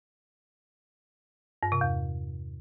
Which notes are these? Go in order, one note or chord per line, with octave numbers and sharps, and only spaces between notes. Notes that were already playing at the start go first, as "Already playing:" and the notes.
G2
C3
E2